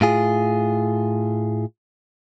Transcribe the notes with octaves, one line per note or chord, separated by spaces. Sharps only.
A2 F4 G#4